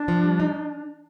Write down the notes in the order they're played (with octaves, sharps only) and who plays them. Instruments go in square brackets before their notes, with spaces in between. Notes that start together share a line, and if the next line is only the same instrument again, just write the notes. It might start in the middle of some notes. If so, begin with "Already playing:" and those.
Already playing: [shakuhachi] D4
[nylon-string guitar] F3
G3
D#4